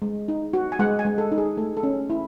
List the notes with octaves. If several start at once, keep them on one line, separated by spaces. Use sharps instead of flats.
G#3
D#4
F#4
G#5
G#3 F#5
G#5
G#3
A4
D#4
G#4
A3 A4
A4
C#4
E4